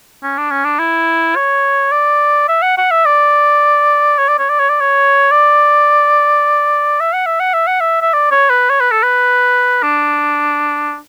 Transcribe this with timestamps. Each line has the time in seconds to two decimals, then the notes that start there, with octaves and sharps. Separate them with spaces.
0.23 C#4
0.38 D4
0.51 C#4
0.65 D4
0.79 E4
1.36 C#5
1.92 D5
2.48 E5
2.62 F#5
2.77 F#5
2.91 E5
3.06 D5
4.18 C#5
4.28 D5
4.39 C#5
4.50 D5
4.59 C#5
4.69 D5
4.80 C#5
5.31 D5
7.00 E5
7.13 F#5
7.26 E5
7.40 F#5
7.53 E5
7.67 F#5
7.80 E5
8.02 E5
8.13 D5
8.31 C#5
8.50 B4
8.70 C#5
8.80 B4
8.91 A4
9.03 B4
9.82 D4